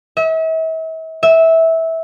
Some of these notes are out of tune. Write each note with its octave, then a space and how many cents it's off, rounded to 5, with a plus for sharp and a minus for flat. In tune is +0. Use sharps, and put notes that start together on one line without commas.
E5 -40
E5 -15